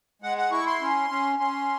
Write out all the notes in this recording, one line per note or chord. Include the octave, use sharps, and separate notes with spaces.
G#3 F#5
F#5
E4 C#6
C6
C#4
C#4
C#4 C6